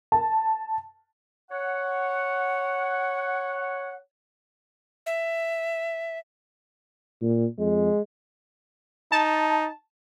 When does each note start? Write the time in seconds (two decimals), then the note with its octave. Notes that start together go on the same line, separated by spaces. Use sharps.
0.12 A5
1.50 C#5 F#5
5.06 E5
7.22 A#2
7.59 F2 G#3
9.12 D#4 A5